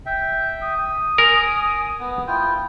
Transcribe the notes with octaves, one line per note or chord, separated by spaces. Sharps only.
E5 G5
D#6
A#4 G#5
B3
E4 F4 G5